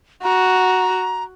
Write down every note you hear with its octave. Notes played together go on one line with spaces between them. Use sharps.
F#4 A#5